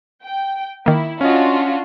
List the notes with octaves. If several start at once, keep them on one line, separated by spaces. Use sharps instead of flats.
G5
D#3 A#3 E4
C#4 D4 F4 F#4 D#5